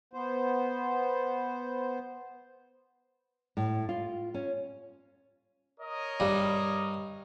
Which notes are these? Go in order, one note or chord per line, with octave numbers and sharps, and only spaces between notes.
B3 C5
A2
F4
C#4
A#4 C#5 D#5
G2 G3